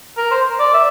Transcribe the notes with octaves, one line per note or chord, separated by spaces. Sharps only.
A#4
C5
D5
E5